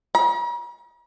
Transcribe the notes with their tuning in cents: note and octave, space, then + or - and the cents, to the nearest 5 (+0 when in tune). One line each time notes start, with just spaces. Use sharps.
A#5 +45